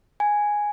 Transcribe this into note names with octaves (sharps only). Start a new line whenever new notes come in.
G#5